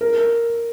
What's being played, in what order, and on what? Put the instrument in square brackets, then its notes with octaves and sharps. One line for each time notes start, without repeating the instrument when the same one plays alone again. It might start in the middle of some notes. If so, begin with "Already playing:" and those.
[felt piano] A#4